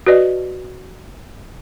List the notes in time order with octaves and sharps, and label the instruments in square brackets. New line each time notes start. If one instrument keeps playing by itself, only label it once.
[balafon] F#4 B4 D5 D#5